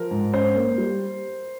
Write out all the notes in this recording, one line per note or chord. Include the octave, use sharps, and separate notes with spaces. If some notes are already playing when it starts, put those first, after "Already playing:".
Already playing: F3 A#4
G#2
C#4 C5
A#3
G3